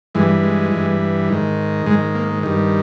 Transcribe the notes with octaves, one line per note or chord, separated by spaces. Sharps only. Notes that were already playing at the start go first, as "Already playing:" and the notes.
G2 E3 G#3
G#3
G2 E3
G#2 D#3
G#2 D#3 G#3
A#3
G2 D#3